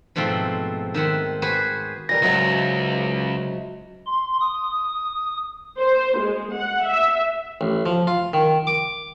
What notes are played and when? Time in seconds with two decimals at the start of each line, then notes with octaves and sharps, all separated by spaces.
0.16 G#2 B2 F3 A3 C4
0.94 D#3 E5 F#5 C6
1.42 F#4 G#4 B4 C5
2.09 E3 G3 A#4 A#6
2.22 C#2 G#2 F#3 E5
4.07 C6
4.41 D#6
5.81 C5
6.21 G#3
6.56 F#5
6.89 E5
7.61 A1
7.86 F3
8.07 F4
8.33 D#3
8.67 D6